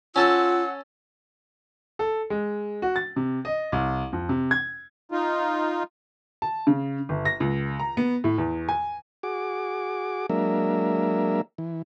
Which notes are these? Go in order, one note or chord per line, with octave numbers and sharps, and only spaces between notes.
C#4 F4 A4 F#5 A5 E6
A4
G#3
F#4
A6
C3
D#5
C2
F2
C3
G#6
D#4 F4
A5
C#3
G1
A#6
C#2
A#5
B3
A2
E2
G#5
F#4 G#4 D6
F#3 G#3 A#3 D4 A#4 E5
E3